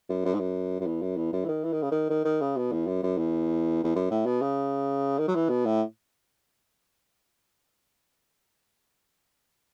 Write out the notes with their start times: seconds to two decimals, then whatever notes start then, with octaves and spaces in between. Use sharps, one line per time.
0.09 F#2
0.25 F#2
0.34 G#2
0.40 F#2
0.80 F#2
0.87 E2
1.02 F#2
1.17 E2
1.33 F#2
1.45 E3
1.48 D#3
1.64 E3
1.73 D#3
1.82 C#3
1.92 D#3
2.10 D#3
2.25 D#3
2.41 C#3
2.57 B2
2.72 E2
2.87 F#2
3.03 F#2
3.18 E2
3.84 E2
3.95 F#2
4.11 A2
4.26 B2
4.42 C#3
5.19 D#3
5.28 F#3
5.35 E3
5.49 B2
5.66 A2